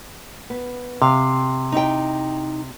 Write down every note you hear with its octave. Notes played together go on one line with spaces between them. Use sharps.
B3
C3 F5
D#4 E4 G5